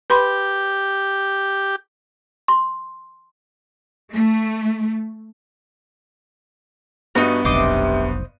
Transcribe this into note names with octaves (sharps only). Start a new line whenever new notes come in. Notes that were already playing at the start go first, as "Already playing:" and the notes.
G4 B4 B5 C6
C6
A3
G2 B3 D#4 F#4
F1 B1 C3 C5 D#5 D6